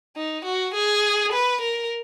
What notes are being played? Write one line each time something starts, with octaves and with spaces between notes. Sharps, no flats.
D#4
F#4
G#4
B4
A#4